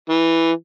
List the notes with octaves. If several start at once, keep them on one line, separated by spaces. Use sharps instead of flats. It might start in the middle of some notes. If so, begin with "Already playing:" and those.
E3